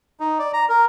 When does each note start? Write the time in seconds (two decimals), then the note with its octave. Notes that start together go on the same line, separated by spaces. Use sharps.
0.20 D#4
0.39 D5
0.53 A#5
0.69 A#4